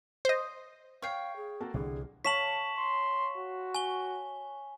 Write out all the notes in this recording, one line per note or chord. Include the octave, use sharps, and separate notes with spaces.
C5 D#5
C#5 F5 G5 F6 C7
G#4
A#3 F#4 A4
C2 D3 E3 G3 G#4
C#5 F5 A5 B6 E7 F#7
C6
F#4
G#5 G7